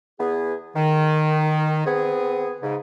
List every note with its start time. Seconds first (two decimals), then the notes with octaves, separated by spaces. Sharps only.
0.19 E2 B3 G#4
0.75 D#3
1.86 B3 C4 G#4
2.62 G#2 C#3